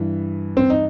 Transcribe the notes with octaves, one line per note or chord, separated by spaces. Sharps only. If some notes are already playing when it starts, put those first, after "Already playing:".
Already playing: G2 E3
C4
D#4